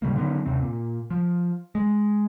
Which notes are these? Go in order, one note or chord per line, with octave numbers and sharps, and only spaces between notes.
A2 C#3 G3 A#3
D3 D#3 F#3 B3
D#2 C3 C4
A#2
F3
G#3